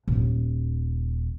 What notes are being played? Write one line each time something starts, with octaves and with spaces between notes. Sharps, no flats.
D#1